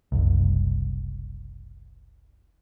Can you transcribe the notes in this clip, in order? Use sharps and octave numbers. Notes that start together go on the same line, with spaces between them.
F#1 C2